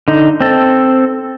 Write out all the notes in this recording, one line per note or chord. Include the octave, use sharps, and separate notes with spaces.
D3 D#4
C4 A4